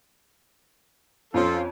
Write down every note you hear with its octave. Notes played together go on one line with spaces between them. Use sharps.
F2 F3 C#4 F4 A4